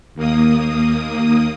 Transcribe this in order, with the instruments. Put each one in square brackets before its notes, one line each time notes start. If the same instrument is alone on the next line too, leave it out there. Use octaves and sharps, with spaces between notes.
[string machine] D#2 A#3 D#6